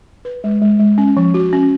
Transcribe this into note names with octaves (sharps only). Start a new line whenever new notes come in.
B4
G#3
G#3
G#3
C#4
F3
F#4
C#4